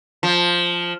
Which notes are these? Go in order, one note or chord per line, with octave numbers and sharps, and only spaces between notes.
F3